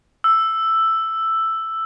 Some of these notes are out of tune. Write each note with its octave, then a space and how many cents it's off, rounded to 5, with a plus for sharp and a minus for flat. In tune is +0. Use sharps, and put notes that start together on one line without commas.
E6 +5